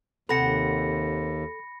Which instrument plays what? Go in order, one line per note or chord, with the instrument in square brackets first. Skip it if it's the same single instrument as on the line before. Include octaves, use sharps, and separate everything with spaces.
[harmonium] D#2 [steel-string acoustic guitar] C3 C5 F#5 [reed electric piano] A4 [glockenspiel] B5 A#6 C#7